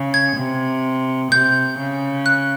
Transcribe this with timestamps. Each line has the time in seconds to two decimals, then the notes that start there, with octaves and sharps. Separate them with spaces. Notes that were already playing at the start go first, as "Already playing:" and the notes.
Already playing: C#3
0.14 G#6
0.37 C3
1.32 C3 G6
1.79 C#3
2.26 F#6